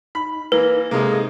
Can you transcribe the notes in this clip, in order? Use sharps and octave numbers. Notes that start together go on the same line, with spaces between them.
D#4 B5
E3 A#3 B4
C3 G#3 A#3 D#4 G#4 A4 D#6